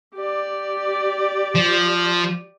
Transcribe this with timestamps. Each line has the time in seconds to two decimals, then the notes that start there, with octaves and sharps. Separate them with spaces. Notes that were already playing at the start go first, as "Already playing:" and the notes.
0.15 G4 D5
1.55 F3